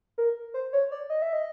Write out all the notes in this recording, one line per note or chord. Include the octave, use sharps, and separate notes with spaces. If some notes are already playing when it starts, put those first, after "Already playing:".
A#4
C5
C#5
D5
D#5
E5
D#5